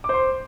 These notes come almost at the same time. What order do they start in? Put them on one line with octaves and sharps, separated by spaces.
D6 C5 C6